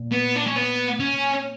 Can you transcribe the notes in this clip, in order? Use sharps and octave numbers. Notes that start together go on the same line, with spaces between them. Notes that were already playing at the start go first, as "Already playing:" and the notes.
Already playing: A#2
B3
D4
C#4
B3
C#4